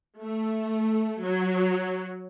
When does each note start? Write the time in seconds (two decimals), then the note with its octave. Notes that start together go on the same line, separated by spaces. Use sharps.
0.21 A3
1.23 F#3